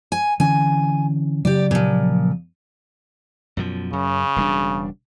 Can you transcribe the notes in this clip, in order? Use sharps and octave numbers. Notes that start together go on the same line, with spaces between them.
G#5
D3 E3 C#4 G#5
C#3 F#3 G4 D5
A#2 F3
F#2 B2 F3
F#2 C#3
E1 G3 D4